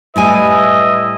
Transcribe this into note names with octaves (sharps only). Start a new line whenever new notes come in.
A2 G3 E4 B4 D#5 G#5